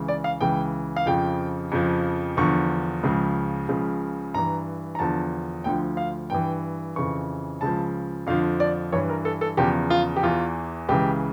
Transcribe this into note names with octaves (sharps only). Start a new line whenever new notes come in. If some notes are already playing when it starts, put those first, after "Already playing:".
Already playing: C#2 C#3 E3
D5
F5
C#2 C#3 E3 G5
F5
F2 C#3 F3 G5
F2 C#3 F3
E2 D3 F3 C#6
C#2 C#3 F3
C#2 C#3 F3
G2 E3 A#5
A#5
E2 D3 F3 A5
D2 D3 F3 G5
F5
G2 E3 G5
F2 C#3 E3 C#6
C#2 C#3 F3 A5
F2 D3 F3 F5
D5
G2 E3 C#5
A#4
A4
A4
E2 C#3 F3 G4
F4
G4
E2 E3 F4
C#2 C#3 E3 G4